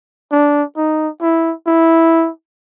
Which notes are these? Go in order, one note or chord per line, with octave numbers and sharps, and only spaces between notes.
D4
D#4
E4
E4